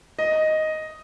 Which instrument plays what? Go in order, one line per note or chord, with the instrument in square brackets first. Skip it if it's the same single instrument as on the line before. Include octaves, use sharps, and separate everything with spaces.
[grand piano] D#5